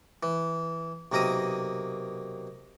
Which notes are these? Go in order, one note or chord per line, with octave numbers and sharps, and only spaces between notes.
E3
B1 C3 A#3 A#4 A#5 D#6